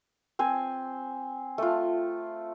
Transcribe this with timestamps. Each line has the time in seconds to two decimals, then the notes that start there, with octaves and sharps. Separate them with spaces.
0.39 C4 C5 G#5
1.58 A3 F4